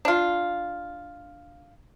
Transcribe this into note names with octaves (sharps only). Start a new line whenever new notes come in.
D4 F4